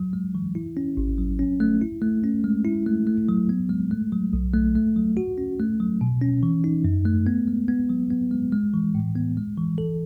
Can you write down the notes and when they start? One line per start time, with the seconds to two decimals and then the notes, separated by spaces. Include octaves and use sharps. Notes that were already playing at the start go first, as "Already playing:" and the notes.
Already playing: F#3
0.13 G#3
0.35 E3
0.55 E4
0.77 C#4
0.97 G#1
1.18 F#3
1.39 C#4
1.60 A3
1.82 E4
2.02 A3
2.23 C#4
2.44 G#3
2.65 E4
2.86 A3
3.07 A3
3.29 F#3
3.49 B3
3.69 G#3
3.91 A3
4.12 F#3
4.33 B1
4.54 A3
4.75 A3
4.96 F#3
5.17 F#4
5.38 C#4
5.59 A3
5.80 F#3
6.01 B2
6.22 C#4
6.43 E3
6.64 D#4
6.85 F#2
7.05 A3
7.27 B3
7.48 G#3
7.68 B3
7.89 F#3
8.11 B3
8.31 G#3
8.52 G#3
8.74 E3
8.95 A2
9.15 B3
9.37 G#3
9.58 E3
9.78 A4